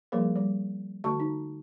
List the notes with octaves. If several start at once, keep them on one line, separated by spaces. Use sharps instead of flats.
F3 G3 A#3 G#4 A#4
G3
D3 A3 F#4 A5 C#6
D#4